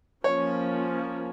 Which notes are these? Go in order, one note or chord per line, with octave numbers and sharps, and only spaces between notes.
F3 A#3 C#4 C#5